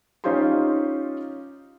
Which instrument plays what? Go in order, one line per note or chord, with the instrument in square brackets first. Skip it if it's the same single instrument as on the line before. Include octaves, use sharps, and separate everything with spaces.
[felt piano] C#4 D#4 F4 G4 C6